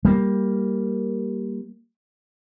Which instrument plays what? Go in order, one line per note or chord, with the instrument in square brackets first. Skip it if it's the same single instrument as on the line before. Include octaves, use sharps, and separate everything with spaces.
[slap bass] G3 A#3